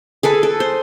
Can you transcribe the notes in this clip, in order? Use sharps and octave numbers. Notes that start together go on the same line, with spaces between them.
G#4 A4 B4
A4
C5